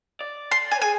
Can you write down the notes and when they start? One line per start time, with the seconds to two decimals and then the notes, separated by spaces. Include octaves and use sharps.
0.21 D5
0.51 C6
0.71 G#5
0.82 G#4 G#5